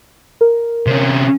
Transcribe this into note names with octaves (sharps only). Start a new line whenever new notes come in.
A#4
C3 C#4